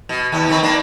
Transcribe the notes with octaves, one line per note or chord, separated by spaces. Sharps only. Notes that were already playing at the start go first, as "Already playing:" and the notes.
B2
D#2 B3
D#3 B3 C4
A#3 B3 D4